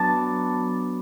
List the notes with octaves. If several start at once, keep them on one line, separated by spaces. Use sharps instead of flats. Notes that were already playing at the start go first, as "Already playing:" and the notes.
Already playing: F#3 B3 D4 A5